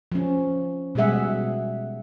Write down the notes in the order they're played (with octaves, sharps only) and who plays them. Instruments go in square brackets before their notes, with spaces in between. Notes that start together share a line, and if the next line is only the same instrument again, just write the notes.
[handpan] F3 C#4
B2 G3 G#3 G#4 E5 F#5